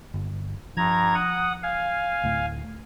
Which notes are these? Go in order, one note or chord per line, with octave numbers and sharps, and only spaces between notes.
G1
G2 F3 A#5 G#6
F#5 D#6
F5 G#5
D2 A2